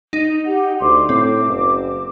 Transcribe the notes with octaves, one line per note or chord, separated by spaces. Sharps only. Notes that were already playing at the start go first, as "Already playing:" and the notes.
D#4
G4 F#5
D2 C6 D6
A2 C4 D6
F#1